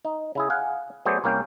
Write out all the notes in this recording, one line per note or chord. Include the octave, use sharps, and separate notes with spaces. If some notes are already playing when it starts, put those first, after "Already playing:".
D#4
C#3 E4 G#4
F5 F#5 G#5
F#3 A3 B3 G#4 C5 D5
C2 A#3 C#4 G5